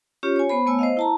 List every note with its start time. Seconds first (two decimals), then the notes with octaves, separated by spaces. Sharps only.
0.23 C#4 F4 G4 C#5
0.36 C#5 G#5
0.49 B3 C5 B5
0.66 A3 B3 C#5 G#5 E6
0.79 C5 D#5 F5
0.97 E4 A5 A#5